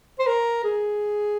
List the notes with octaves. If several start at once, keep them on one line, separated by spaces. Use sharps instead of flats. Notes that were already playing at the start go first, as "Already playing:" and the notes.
C5
A#4
G#4